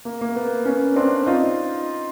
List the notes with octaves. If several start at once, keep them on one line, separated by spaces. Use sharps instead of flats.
A#3
A#3
B3
B3 C#4
C4 D4
D#4 F4